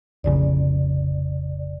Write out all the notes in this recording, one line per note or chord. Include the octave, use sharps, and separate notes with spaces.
F1 A#1 C#3 D5